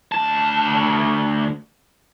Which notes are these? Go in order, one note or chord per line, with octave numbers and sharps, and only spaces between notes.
D2 A5